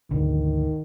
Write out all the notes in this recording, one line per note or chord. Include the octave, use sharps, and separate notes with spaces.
G#1 D2 D3 D#3